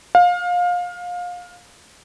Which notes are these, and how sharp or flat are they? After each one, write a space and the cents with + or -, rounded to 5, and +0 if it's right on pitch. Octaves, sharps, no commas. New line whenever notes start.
F5 +25